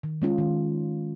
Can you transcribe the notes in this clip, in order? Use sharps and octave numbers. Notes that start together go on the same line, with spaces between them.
D#3
G#3 C#4 F4
D#3